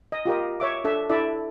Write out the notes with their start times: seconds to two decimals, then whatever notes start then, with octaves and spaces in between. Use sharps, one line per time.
0.12 D#5
0.25 F4 G4 A#4 D#5
0.60 C#5 E5 D6
0.84 D4 A4 E5
1.10 D4 E4 A4 D5 E5